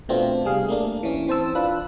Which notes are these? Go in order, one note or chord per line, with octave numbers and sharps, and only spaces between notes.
B2 A3 B3 C4 D4 F4
C2 G3 G#4 F5
A3 A#3 D4
E3 C#4
E3 C4 C5 A5 E6
D4 F4 B4 F#6